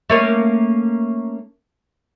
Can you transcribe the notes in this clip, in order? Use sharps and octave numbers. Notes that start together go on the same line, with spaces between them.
A3 A#3 C#4